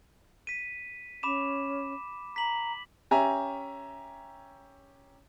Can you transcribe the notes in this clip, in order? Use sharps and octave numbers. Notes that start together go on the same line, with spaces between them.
B6 D#7
C#4 B5 D6 E7
A#5 B6 F#7
C#4 G4 E5 G#5 A#5